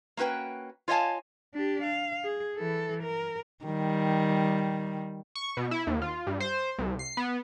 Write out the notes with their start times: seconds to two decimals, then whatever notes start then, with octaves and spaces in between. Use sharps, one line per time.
0.17 A#3 C#4 F#4 B4 G5
0.88 F4 C#5 D#5 F5 G#5 A5
1.54 D4 G4
1.84 F5
2.24 G#4
2.57 E3 A4
3.03 A#4
3.65 D#3 G3
5.35 C#6
5.57 B2
5.71 E4
5.87 D#2
6.02 F4
6.27 G2
6.40 C5
6.78 C2
6.99 C7
7.17 B3